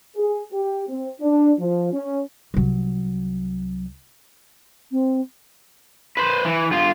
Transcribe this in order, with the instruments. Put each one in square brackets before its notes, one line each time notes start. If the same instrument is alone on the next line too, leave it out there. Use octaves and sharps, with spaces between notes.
[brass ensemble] G#4
G4
C4
D4
F3
C#4
[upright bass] C2 F#3
[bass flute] C4
[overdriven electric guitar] B4 C5
E3
G2 F4